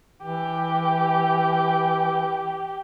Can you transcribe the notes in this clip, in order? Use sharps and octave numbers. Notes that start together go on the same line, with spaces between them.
E3 G4